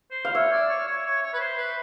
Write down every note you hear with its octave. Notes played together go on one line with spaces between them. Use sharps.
C5
F5
C#5 E5
D5
C#5
C#5
C#5
C#5
B4
C5
B4